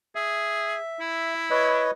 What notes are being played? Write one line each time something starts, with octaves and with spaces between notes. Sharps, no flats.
G#4 E5
E4
B4 C#5 D#5